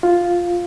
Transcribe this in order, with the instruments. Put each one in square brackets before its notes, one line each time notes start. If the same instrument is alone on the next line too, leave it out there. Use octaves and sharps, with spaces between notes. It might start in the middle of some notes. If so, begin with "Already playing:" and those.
[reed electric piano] F4